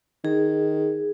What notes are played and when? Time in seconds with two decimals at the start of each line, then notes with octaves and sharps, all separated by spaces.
0.24 D#3 G#4